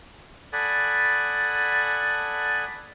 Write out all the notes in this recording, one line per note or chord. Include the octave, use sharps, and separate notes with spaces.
A4 D5 F#5 G#5 B5 D#6